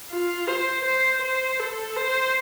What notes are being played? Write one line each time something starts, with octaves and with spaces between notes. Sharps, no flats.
F4
C5
C5
C5
A4
C5